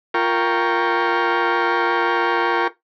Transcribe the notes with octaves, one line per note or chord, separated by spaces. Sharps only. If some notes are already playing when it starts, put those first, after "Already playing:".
F4 A#4 G5 C#6